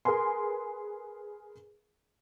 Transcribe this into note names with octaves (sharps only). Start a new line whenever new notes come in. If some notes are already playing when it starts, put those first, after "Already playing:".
G#4 A#4 B4 G#5 C6